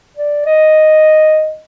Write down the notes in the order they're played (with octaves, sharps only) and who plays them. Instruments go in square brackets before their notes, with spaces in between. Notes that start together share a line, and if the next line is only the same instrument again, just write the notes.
[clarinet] D5
D#5